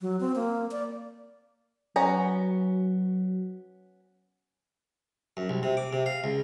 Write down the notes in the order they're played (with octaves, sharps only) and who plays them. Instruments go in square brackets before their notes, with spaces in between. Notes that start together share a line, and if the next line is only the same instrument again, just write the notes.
[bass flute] F#3
C4
A#3
D5
[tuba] F#3 [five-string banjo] B3 C#4 A#5
[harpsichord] F#2
C2
C3
D6
C3
F5
C#2